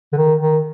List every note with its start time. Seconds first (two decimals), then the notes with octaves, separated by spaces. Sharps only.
0.13 D3
0.17 D#3
0.40 D#3